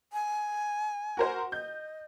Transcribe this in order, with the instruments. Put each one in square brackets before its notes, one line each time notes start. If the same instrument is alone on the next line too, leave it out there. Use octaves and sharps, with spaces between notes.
[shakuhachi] G#5
[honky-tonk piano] F#4 A#4 C5
[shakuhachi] D#5 [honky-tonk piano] G6